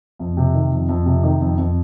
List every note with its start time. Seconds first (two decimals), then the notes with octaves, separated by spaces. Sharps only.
0.19 F2
0.37 C3
0.54 D#3
0.71 F2
0.89 F2
1.06 C3
1.24 D#3
1.40 F2
1.58 F2